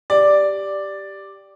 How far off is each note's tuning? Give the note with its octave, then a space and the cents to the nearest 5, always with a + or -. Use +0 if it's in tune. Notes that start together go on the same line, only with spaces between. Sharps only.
G4 +0 D5 +0